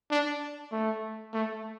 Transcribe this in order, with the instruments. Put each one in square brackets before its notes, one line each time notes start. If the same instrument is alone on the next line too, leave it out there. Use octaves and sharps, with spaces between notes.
[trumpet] D4
A3
A3